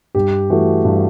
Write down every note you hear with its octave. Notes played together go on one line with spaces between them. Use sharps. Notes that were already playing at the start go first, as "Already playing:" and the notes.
G2 G4
E3 A3 F#4
G2